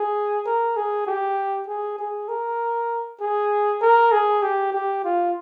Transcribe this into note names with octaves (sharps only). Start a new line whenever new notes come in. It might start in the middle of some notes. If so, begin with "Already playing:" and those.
Already playing: G#4
A#4
G#4
G4
G#4
G#4
A#4
G#4
A#4
G#4
G4
G4
F4